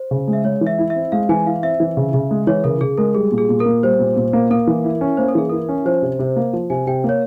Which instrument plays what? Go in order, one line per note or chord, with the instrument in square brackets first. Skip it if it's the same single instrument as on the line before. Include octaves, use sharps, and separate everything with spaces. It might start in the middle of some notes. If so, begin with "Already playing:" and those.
Already playing: [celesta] C5
[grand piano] C#3
G#3
[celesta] E5
[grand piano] G#3 [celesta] C#5
[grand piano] E3
[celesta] E5
[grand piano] E4
[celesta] E5
[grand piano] C4
[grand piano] G#3 [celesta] F5
[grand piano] E3 [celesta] G#5
[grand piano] E4 [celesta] F5
[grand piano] C4 [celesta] E5
[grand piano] E3
C#3
C#3
G#3
[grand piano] E3 [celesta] C#5
[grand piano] C#3 [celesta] A#4
[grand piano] C#3 [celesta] G#4
[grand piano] G#3 [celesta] A#4
[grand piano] G3 [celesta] G#4
[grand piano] A#2
[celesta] G#4
[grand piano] A#2
[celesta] A#4
[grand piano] A#3
[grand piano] G3 [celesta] C5
[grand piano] A#2
A#2
A#3
[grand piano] A#3 [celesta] A#4
[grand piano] E3
E4
C#4
[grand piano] A#3 [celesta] C5
[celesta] A#4
[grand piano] E3 [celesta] G#4
[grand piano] E4 [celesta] A#4
[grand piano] C#4
[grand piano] F3 [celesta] C5
[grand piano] C3
C3
A#3
F3
[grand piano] C3 [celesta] G#5
[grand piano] C3 [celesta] G5
[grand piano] A#3
[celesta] C#5